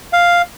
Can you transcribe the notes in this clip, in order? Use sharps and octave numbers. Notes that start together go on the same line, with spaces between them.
F5